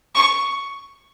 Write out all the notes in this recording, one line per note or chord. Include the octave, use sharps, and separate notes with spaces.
C#6